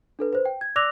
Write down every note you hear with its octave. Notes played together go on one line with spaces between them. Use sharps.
D4 A4 B4
B4 C5
G5
G#6
D5 D6 E6 F#6 A#6 F7